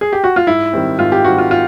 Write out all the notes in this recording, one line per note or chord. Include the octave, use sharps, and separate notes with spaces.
G#4
G4
F#4
F4
G#2 E4
D#3 G3 C4
G#2 F4
G4
D#3 G3 C4 F#4
F4
F4